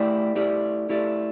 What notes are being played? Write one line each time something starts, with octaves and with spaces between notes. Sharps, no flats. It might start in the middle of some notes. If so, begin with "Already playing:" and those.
Already playing: A3 E4 G4 D5
A3 E4 G4 D5
A3 E4 G4 D5